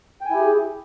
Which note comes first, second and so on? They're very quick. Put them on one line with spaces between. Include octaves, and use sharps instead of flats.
G5 G#5 E4 G4 G#4